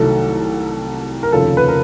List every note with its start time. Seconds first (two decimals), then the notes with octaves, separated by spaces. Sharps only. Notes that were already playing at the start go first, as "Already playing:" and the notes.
Already playing: C2 C3 D#3 F#3 A3 A4
1.23 A#4
1.32 F1 D#2 C#3 F3 A4
1.57 B4
1.68 A#4